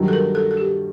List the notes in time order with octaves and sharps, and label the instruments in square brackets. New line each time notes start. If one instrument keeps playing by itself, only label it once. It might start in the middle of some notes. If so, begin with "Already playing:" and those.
Already playing: [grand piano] G2 D#3 F#3
[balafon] A4
A#4
A4
A4
G4